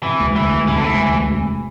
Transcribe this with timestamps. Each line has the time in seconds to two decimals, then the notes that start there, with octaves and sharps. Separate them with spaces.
0.03 C3 E3
0.19 E1
0.35 D2 E3
0.52 E1
0.68 C3 E3
0.76 D3
0.83 E1 E3
0.99 D2
1.14 E1
1.31 C3